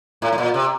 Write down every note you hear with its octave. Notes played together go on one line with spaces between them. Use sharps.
A2
A2
A#2
C3